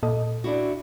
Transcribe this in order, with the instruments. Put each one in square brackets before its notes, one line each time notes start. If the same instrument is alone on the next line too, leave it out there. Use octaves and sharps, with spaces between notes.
[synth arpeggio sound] A#2 A4 D#5
[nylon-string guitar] D4 E4 F#4